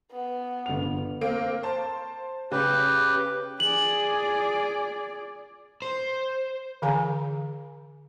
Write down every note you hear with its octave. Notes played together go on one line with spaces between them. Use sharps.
B3
G1 F7
A#3 C4 D7
C5 A5
C#3 G4 B4
G#4 D5 F#7
C5
D3 E3 G#4 F5 G#5 A#5